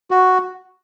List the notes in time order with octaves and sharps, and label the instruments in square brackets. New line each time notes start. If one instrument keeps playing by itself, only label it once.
[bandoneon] F#4